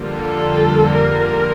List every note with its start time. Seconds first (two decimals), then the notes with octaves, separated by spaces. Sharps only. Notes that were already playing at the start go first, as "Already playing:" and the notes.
Already playing: F2 D3 G3 A#3 F4
0.09 A4
0.98 A#4